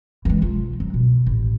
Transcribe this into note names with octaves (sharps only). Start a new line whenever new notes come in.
E3 G#3
B1 F4
F#3
B2
A1